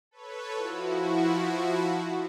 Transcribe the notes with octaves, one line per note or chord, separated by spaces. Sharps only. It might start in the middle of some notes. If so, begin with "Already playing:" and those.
A4 B4 C#5
F3 E4 F#4